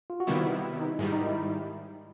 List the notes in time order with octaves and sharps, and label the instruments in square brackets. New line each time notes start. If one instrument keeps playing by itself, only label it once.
[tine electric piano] F4
F#4
[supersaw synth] C3 D#3 G3 B3 E4 [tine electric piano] F4
[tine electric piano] D#4
[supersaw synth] G#2 D#3 G3 [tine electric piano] E4
[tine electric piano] D#4
E4